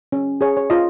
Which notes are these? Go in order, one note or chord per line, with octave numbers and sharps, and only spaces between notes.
C#4
G#4 C#5
C#5
F4 D#5